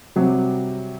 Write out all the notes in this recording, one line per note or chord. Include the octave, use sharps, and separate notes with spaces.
C3 F#3 G3